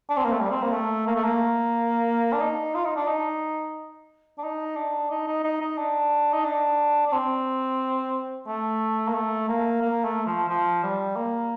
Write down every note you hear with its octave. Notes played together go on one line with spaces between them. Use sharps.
D4
C4
A#3
A3
G3
C4
A#3
A3
A#3
A3
A#3
D4
D#4
F4
D#4
D4
D#4
D4
D#4
D4
D#4
D#4
D#4
D#4
D4
D#4
D4
D4
C4
A3
A#3
A3
A#3
A#3
A3
F3
F3
G3
A#3